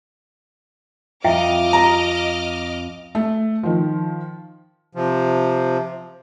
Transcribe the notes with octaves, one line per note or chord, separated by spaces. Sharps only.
F2 E4 D#5 E5 G5 D6 F6
A#5
A3
D#3 F3
C3 F3